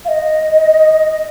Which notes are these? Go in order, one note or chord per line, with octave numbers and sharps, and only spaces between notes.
F5
D#5